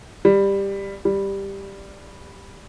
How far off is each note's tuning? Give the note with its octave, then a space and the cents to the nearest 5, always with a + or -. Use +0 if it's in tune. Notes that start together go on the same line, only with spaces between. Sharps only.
G3 +15
G3 +10